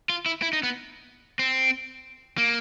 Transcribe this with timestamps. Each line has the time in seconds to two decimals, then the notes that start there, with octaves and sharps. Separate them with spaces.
0.10 F4
0.26 E4
0.42 E4
0.53 D#4
0.63 B3
1.39 C4
2.38 A#3